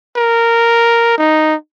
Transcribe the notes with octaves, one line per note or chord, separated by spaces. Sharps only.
A#4
D#4